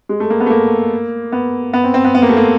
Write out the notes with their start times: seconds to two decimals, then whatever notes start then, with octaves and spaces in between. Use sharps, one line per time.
0.09 G#3
0.20 A3
0.30 A#3
0.40 B3
0.46 A3
0.50 A#3
1.32 B3
1.73 B3
1.84 C4
1.94 C4
2.05 B3
2.15 B3
2.22 A#3
2.29 A3
2.37 A#3